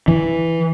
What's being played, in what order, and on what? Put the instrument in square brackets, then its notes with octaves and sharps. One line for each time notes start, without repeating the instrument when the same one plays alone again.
[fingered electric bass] E3